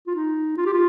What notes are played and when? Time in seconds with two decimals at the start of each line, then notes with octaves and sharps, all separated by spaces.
0.07 F4
0.16 D#4
0.57 F4
0.66 G4
0.73 F4